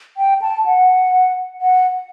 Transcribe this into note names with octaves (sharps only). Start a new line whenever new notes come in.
G5
A5
F#5
F#5